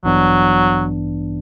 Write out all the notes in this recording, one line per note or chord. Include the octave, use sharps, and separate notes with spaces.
A1 G2 E3 F#3 B3 D4